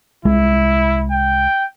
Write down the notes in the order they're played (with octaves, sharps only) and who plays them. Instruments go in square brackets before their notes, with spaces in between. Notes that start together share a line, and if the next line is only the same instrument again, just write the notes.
[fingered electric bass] C2 G#3 [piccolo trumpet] E4
[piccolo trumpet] G5